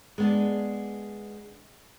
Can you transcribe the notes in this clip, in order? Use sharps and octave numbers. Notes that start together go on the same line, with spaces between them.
G#3 B3 D4